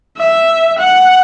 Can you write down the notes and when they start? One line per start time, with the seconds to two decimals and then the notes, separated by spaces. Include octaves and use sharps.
0.18 E5
0.79 F#5